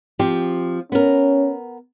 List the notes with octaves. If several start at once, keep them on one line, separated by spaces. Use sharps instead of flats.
F3 C4 G4
B3 C#4 A#4